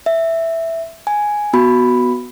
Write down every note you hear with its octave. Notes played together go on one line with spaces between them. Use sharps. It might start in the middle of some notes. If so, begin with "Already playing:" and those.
E5
G#5
B3 F#4 B5